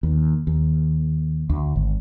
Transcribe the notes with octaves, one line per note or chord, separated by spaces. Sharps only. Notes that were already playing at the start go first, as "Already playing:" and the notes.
D#2
D#2
D2
G#1